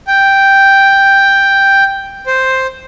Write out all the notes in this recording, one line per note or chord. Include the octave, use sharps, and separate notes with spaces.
G5
C5